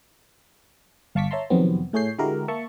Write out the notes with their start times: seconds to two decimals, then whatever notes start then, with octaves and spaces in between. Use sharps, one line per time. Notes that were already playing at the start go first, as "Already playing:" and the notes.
1.15 G1 F5 A5 C#6 D6 B6
1.31 C#5 E5 A5 A#5 C6
1.50 F2 C3 D#3 F#3 B3 C4
1.93 A2 A3 G#4 C#5 G6 C7
2.18 D3 G#3 E4 F#4 G4 A#4
2.48 A#3 E5 A5 C#6 C#7